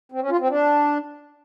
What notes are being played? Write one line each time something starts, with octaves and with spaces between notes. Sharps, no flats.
C4
C#4
F4
C4
D4